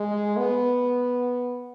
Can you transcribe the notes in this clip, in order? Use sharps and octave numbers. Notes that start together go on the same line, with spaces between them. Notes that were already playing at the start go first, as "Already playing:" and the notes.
Already playing: G#3
B3